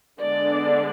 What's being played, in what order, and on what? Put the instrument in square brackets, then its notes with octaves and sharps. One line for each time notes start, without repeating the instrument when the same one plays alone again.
[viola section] D3 G#3 B3 D4 D5